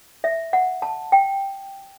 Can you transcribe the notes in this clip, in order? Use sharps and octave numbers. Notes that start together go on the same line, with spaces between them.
E5
F#5
A5
G5